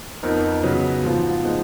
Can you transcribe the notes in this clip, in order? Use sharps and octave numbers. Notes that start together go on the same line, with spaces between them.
F2 F3 B3 D#4 A#4
C#3 F#3 B3
G#2 F3 B3 F4
F3 G#3 B3 D#4